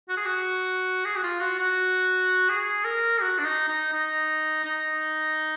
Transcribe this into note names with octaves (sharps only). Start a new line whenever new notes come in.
F#4
G#4
F#4
G#4
F#4
F4
F#4
F#4
G#4
A#4
F#4
D4
D#4
D#4
D#4
D#4